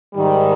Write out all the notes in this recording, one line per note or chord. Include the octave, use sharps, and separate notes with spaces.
G#2 D#3 G3